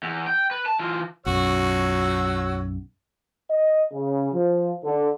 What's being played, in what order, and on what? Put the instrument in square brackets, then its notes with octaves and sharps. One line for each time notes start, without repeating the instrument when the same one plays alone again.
[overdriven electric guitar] E2
G5
B4
A5
E3 F4
[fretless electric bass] B1 F#2 [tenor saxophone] F#4 [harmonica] C#5 E6
[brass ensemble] D#5
C#3
F3
D3